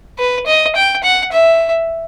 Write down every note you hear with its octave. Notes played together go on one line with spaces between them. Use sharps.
B4
D#5
G5
F#5
E5